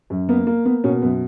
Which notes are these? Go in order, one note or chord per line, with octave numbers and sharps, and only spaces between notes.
F#2
A#3 B3
A#3
A#3 B3
B2 C#4
F#2 B3